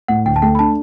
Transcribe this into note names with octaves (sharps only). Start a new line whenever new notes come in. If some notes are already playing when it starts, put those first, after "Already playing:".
A2 F#5
D2 G5
A5
A3 G5
B5
D4 A5